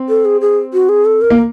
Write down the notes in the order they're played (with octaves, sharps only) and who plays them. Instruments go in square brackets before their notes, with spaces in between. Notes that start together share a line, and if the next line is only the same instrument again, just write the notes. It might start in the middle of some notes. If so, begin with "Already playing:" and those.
Already playing: [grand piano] C4
[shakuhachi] A4
G#4
G#4
F#4
G#4
A4
A#4
[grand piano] A#3